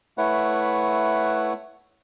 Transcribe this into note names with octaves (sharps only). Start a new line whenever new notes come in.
A3 E4 B4 C#5 F#5